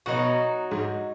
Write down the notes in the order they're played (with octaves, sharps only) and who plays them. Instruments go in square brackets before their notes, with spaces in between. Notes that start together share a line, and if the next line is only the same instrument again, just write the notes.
[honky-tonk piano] B2 B3 [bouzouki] F#3 D#4 F#4
[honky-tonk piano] G#2 G#3